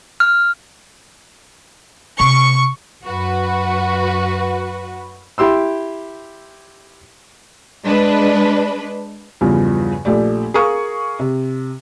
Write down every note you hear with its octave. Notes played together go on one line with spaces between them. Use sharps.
F6
C3 C#6
F#2 F#4 B4
E4 G4 C6 E6
G#3 D4 B4
E2 G2 C#3 F3
A#1 A3 G4 D5
G#4 A#4 F5 C#6 D#6
C3